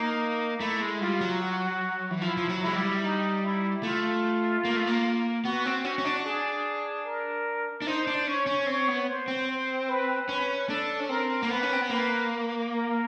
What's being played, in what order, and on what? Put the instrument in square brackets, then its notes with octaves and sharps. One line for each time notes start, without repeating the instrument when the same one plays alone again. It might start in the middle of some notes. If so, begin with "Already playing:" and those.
Already playing: [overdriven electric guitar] A#3 [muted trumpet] D#4
[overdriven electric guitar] A3 [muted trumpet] E4
[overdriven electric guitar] G#3
[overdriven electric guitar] G3 [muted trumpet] F4
[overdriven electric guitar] F#3
[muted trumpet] F#4
[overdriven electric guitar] E3
[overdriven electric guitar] F3 [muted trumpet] E4
[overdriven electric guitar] F3
F#3
[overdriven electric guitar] G#3 [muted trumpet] E4
[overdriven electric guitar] G3
[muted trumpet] D#4
E4
[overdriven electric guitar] A3 [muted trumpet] F4
[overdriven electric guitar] A#3
A3
A#3
[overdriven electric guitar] B3 [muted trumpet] F#4
[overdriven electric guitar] C4
[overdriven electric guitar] C#4 [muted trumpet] F#4
[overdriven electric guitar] C#4
D4
[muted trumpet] G#4
A#4
[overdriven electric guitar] D4
[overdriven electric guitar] D#4 [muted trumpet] C5
[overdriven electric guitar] D4
[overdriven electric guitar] C#4 [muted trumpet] C#5
[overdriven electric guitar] C#4
[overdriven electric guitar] C4 [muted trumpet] C#5
[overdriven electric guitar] B3
[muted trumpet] C5
[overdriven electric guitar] C4
[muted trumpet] C5
B4
[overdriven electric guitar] C#4 [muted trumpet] B4
[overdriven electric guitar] D4 [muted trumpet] A4
[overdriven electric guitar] C#4
[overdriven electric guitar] C4 [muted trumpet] A#4
[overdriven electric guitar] A#3
[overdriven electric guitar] B3 [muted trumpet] B4
[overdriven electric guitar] C#4
C4
B3
[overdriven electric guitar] A#3 [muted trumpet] B4
[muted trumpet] A#4